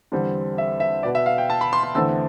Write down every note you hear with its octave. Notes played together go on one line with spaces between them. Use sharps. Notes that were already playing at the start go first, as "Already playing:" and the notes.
E2 D3 G3 C4
E5
E5
B2 B3 D5
E5
F5
G5
A5
B5
C6
C6
E2 D3 A3 C4 E6